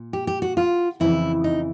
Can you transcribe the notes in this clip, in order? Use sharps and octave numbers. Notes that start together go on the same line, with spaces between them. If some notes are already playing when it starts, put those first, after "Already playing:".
Already playing: A#2
G4
G4
F#4
F4
F2 C#3 E3 E4
D#4